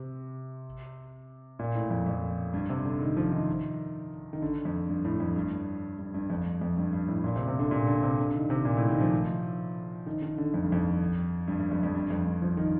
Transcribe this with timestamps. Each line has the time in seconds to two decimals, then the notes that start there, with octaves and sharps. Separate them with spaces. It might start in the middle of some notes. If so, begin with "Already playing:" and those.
Already playing: C3
1.59 A#2
1.75 A2
1.90 F2
2.06 F2
2.54 G2
2.69 C3
2.85 D3
3.00 D#3
3.17 F3
3.32 D#3
4.33 D#3
4.42 D3
4.65 F2
4.89 G2
5.05 A2
5.20 F2
5.36 G2
5.99 G2
6.14 G2
6.30 F2
6.61 F2
6.77 G2
6.93 G2
7.08 A2
7.24 A#2
7.36 C3
7.47 C3
7.59 D3
7.71 A#2
7.87 D3
8.03 C3
8.18 D3
8.34 D#3
8.50 C3
8.65 A#2
8.77 A2
8.89 D#3
9.01 F3
10.06 D#3
10.22 D#3
10.38 D3
10.54 F2
10.63 G2
10.72 F2
11.48 G2
11.59 G2
11.71 F2
11.83 F2
11.95 G2
12.10 F2
12.26 G2
12.42 F3
12.57 D#3